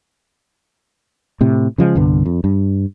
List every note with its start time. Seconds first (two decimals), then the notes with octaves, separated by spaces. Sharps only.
1.41 A2 C3
1.78 C#3 F3 G#3
1.95 C2 G2 D3 B3
2.26 F2
2.44 G2